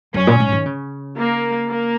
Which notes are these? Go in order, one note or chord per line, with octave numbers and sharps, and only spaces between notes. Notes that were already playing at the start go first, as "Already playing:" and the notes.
F#2 C#4
A#2
G#2
D#3
C#3
A#3
A#3